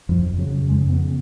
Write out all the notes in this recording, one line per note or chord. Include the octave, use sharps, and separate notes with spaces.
F2 F3
F2
C#3 F#3
C#3
F2 G#3
F2
B3
C#3